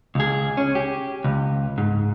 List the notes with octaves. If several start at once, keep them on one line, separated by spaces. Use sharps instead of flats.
C#2 G#4
C#4
G4
C#2
G#2